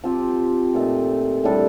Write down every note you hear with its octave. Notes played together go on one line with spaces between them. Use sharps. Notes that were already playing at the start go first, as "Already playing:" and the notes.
F3 C4 G4
A#2 A3 D#4
A2 G3 D4 A4